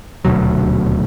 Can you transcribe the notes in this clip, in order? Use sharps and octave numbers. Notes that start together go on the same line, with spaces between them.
D#1 D2 B2 F#3